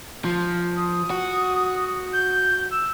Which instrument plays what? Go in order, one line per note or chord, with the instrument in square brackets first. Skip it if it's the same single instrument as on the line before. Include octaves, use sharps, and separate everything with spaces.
[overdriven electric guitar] F3
[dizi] D#6
[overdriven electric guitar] F#4
[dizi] G6
E6